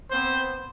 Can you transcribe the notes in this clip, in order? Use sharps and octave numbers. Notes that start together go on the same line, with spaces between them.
B3 C4 C5